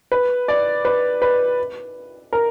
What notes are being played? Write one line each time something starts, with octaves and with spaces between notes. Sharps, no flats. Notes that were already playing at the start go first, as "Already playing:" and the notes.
B4
D5
B4
B4
A#4